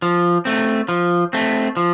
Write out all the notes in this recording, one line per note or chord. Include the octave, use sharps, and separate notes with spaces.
F3
A3 C4
F3
A3 C4
F3